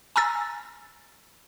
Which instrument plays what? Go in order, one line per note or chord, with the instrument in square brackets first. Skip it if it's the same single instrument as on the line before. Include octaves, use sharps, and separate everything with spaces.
[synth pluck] G#5 A#5 E6 A6